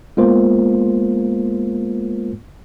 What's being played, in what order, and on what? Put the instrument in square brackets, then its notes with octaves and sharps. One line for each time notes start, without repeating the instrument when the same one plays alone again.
[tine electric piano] G#3 A#3 B3 F4 A#4 C5